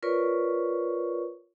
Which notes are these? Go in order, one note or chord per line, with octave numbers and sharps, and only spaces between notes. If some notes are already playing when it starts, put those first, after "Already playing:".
F4 A#4 B4 C#5 D5 C#6